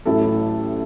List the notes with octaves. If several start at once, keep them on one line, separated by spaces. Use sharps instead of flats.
A1 A2 F#3 A3 E4 A4
E4